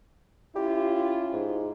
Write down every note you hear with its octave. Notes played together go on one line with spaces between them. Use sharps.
C#4 E4 F4 G4
G#2